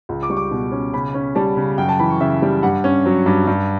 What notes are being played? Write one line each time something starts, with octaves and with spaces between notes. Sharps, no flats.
C#2
D6
G3 C#6
D6
B2
C#4
C#3 B5
C#4
G3 A5
C#3
F#2 G5
A5
E3 B5
C#6
C#3 E5
G3
G2 F#5
C#4
F#3
G2
G2